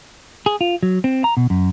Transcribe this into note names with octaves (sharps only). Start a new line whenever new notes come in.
G#4
F4
F#3
C4
A#5
B2
F#2